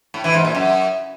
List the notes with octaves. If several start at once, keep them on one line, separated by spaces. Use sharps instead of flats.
A2
E3
G#2
A#2
F#2